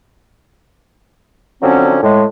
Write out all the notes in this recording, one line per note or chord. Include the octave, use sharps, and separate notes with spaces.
D3 F3 F#3 C4 C#4
A2 G#3